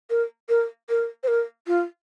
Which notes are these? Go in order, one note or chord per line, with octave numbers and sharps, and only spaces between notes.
A#4
A#4
A#4
C5
A#4
F4